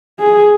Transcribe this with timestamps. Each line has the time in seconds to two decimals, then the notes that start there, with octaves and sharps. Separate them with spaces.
0.20 G#4